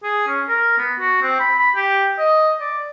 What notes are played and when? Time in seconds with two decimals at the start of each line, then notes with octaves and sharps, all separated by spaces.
0.03 G#4
0.27 C#4
0.49 A#4
0.79 B3
1.00 F#4
1.22 C4
1.40 B5
1.59 B5
1.75 G4
2.19 D#5
2.61 D5